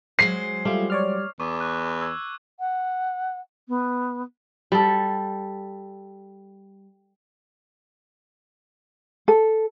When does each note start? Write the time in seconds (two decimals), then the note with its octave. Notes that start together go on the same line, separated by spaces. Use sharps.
0.19 F#3 G#3 C5 C7
0.65 G3 A3 F4
0.90 C#5 D5 F6
1.40 E2 C#6 D6
1.61 C#6 F#6
2.01 E6 G#6
2.59 F#5
3.68 B3
4.72 G3 A4
9.28 A4